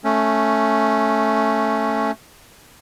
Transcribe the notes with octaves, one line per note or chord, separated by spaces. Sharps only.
A3 C#4